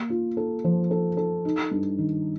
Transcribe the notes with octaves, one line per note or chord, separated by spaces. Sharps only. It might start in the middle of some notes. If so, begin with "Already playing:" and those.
Already playing: A#3
F4
A4
F3
A4
A4
D#4
G2
D#3